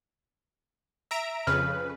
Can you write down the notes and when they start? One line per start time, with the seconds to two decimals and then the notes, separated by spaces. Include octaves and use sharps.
1.11 E5 A#5 D7
1.47 F2 C#3 B4 F6